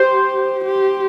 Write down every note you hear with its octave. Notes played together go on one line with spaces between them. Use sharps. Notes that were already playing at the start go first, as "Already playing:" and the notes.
Already playing: G4 C5
G4